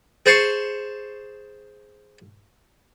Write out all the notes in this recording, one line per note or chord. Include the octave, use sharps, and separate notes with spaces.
G#4 C5 A5 C6 C#6